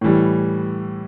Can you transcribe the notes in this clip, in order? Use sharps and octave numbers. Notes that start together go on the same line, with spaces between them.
A2 E3 G3